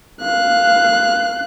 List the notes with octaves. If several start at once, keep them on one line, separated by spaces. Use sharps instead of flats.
F5 F#6